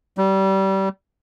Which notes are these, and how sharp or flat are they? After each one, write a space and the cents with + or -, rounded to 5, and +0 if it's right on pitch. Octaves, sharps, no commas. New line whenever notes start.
G3 -25